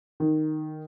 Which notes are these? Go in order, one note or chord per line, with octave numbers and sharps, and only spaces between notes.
D#3